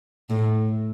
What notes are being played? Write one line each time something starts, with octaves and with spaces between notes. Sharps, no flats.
A2